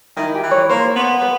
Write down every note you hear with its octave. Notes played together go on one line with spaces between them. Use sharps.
D#3 E4
G4
E3
C#5
A#3 C5
B3
B4